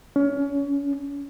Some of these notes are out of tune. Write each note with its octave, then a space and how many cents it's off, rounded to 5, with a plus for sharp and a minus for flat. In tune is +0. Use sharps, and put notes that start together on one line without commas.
C#4 +30